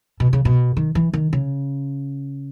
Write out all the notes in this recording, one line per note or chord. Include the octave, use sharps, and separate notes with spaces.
B2
C#3
B2
D#3
E3
D#3
C#3